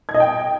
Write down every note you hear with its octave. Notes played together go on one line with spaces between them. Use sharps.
G#6
D#5
G5